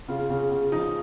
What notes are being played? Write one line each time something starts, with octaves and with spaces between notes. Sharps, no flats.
C#3 F4
C#3
C#3
F3 D#4